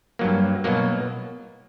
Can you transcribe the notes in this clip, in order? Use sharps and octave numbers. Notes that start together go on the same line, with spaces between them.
G2 F#3 A#3
B2 F#3 A#3